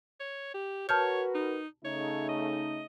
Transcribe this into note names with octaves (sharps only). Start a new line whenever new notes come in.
C#5
G4
F#4 A#4 B4 C#5 A5 F6 G6
D#4
C#3 A3 D#4 C#5
D#5